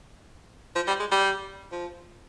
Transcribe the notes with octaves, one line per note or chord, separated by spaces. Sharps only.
F3
G3
G#3
G3
F3